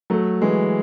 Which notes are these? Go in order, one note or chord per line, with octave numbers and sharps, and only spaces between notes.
F#3 A3
E3 G#3